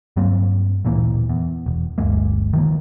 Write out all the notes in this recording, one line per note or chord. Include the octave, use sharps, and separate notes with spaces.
G2 F#3 A#3 C4
D1 A#2 E3 A#3
E2
E1
G1 D2 G#3 A#3
D#3 F3 A#3